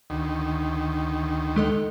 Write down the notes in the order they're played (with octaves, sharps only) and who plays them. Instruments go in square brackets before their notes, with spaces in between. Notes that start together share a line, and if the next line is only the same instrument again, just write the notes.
[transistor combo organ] D2 D#3
[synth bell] G#3 A4 D#5